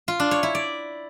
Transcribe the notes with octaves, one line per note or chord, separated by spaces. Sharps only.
F4
D4
C#5
E4
D5